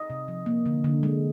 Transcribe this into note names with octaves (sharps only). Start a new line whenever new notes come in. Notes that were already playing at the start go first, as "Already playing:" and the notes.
Already playing: D#5
C3
F3
A#3
D3
D3
G#3